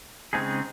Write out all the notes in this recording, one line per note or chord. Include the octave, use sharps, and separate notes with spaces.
C#3 G#3 C4 D#4 G#4